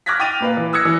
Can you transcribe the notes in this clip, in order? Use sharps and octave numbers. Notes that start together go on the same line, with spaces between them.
D6 F6 F#6 G#6 A#6 B6
G5 D6 F6 A6 D#7 F7
A#2 B4 F5
E3
D#6 E6 F#6 G#6 A#6 C#7
E3